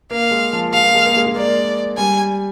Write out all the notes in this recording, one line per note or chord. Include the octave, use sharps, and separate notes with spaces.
A#3 F5
G#3
F3
G#3 F5
A#3
G#3
A#3
G#3
G#3
A#3 D5
G3 G#5